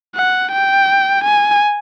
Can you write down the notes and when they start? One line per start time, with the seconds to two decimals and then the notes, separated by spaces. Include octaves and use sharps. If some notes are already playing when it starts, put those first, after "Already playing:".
0.16 F#5
0.51 G5
1.24 G#5